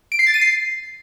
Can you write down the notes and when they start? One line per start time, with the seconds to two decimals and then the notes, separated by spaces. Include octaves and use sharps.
0.12 D7
0.19 C7
0.27 A6
0.34 D#7
0.41 C7